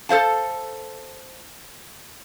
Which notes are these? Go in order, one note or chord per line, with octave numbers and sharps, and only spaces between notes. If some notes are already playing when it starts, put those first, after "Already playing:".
A4 C5 F5 A5